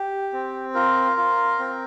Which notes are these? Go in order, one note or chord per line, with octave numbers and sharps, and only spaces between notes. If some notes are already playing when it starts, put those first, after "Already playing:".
Already playing: G4
C4
F4 A#4
F4
C4